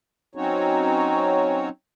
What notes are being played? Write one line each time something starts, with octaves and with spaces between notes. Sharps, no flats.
F#3 C4 C#4 D#4 F#4 C#5